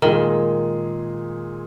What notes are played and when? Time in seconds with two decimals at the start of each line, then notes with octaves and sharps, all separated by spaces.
0.02 A#2 D#3 G#3 D#4 G#4